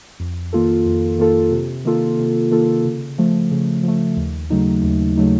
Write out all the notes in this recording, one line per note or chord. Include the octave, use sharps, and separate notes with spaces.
F2
D#3 A#3 F4 A4
F2
D#3 A#3 F4 A4
C3
D#3 A#3 F4 A4
C3
D#3 A#3 F4 A4
C#3
F3 A3
C#3
F3 A3
D#2
C#3 F#3 A3 D#4
D#2
C#3 F#3 A3 D#4